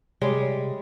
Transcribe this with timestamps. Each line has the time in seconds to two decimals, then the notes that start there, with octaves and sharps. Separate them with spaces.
0.22 C3 G3 G#3 C#5